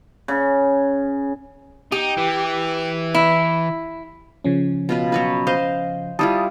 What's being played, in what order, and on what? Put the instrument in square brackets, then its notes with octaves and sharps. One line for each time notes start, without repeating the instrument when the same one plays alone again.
[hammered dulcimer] C#3
[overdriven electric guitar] D#4 [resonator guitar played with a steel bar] G4
[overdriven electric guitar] E3
[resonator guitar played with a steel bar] E4
[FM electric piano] C#3 F3 C#4
[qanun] B2 F4 B4
F#3 F#4 B4
C5 D#5 F5
[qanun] G3 E4 F4 [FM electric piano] A5 D#6